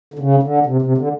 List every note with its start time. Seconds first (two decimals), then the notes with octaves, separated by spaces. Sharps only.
0.14 D3
0.19 C#3
0.43 D3
0.66 C3
0.82 C3
0.98 D3